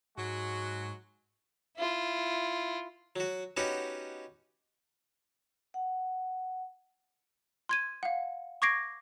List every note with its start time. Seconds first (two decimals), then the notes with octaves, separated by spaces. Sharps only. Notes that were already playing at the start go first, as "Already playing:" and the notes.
0.18 G#2 F#3 G#3 F#4
1.77 E4 F4
3.16 F#3 F#4
3.57 B3 C#4 D#4 F#4 G4
5.74 F#5
7.69 C6 G#6 D#7
8.03 F5 F#5
8.62 C#6 D6 G#6 A#6 C7 D7